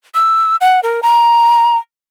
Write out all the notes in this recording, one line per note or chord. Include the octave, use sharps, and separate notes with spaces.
E6
F#5
A#4
A#5